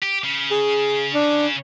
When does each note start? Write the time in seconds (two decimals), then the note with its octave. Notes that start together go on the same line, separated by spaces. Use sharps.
0.03 G4
0.24 C#3
0.51 G#4
1.14 D4